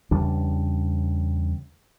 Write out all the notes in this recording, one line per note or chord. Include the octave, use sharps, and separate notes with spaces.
E2 C#3 G3 D4